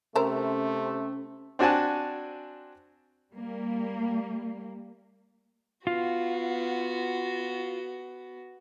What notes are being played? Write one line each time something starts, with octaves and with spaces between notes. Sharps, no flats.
C3 A3 C#4 A4 A#4 C5
C4 D4 F#4 G#5 A5
G3 A#3
B3 F4 F#4